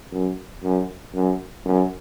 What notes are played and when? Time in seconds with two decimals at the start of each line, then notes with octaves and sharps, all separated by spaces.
0.12 F#2
0.63 F#2
1.14 F#2
1.65 F#2